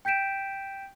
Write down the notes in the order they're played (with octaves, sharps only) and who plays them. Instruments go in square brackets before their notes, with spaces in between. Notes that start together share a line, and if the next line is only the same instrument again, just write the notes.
[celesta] G5 G6 B6 D7 E7